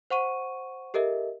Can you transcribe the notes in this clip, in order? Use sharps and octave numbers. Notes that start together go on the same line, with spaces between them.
C5 F#5 C#6 D#7
G4 A4 A#4 D#5 E5